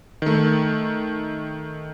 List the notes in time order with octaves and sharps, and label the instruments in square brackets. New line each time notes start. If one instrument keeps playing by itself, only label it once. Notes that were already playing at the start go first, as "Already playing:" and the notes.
[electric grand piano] D#3 A3